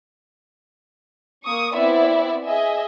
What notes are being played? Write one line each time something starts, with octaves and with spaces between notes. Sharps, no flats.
A#3 C#6 D#6
B3 C4 E4 D5 E5
G#4 D#5 E5 G#5